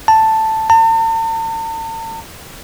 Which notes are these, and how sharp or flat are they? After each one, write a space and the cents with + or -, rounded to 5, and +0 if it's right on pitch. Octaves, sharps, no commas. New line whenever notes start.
A5 +5
A5 +45